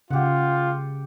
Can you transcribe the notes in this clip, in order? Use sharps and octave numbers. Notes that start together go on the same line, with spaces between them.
C#3 F4 G4 F#5